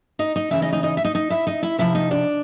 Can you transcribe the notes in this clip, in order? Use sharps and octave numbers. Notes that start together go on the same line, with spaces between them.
D#4 D#5
D#4 D#5
C#3 E3 E4 E5
D#4 D#5
D#4 D#5
D#4 D#5
E5
D#4 D#5
D#4 D#5
E4 E5
D#4 D#5
E4 E5
C3 F3 E4 E5
D#4 D#5
D4 D5